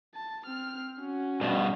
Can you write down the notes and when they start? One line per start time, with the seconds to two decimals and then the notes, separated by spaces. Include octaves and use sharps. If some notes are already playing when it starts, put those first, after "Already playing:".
0.15 A5
0.46 C4 F6
1.01 C#4 F#4
1.41 G2 B2